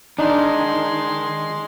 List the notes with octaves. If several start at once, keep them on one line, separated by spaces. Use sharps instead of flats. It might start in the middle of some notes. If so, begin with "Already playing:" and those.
D#3 G#3 D4 D#4 C6